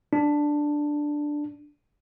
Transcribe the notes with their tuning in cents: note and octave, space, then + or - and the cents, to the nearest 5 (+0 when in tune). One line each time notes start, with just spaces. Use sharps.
D4 +5